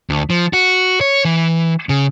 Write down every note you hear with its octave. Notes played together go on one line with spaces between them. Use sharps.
D2
F3
F#4
C#5
E3
C#3